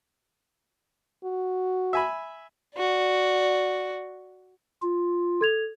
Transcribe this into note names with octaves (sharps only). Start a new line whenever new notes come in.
F#4
E5 G#5 B5
F#4 D5
F4
A4 G#6 F7